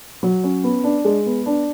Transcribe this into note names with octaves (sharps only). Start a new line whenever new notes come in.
F#3
C#4
B3
D4
G#3
B3
D4